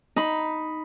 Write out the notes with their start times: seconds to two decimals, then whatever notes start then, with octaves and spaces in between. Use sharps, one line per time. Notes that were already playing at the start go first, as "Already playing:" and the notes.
0.16 D#4 B5